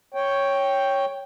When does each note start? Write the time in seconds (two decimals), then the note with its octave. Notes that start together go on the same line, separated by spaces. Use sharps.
0.14 C#5 G5